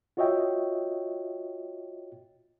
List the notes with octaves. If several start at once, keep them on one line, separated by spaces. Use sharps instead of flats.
F4 F#4 C#5 D#5 E5 G5